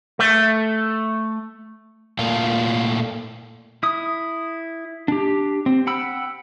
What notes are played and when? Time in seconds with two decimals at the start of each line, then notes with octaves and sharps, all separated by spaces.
0.19 A3
2.19 A#2 A3 F4
3.83 E4 D#6
5.08 D4 G4
5.66 C4
5.87 F#5 G5 B5 E6